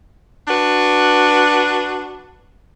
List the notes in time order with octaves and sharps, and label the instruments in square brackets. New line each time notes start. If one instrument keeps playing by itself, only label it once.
[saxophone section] D4 F#4 B4